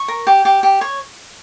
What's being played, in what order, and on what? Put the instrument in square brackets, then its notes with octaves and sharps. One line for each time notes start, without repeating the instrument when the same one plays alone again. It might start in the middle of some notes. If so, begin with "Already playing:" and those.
Already playing: [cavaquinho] C#6
A#4
G4
G4
G4
C#5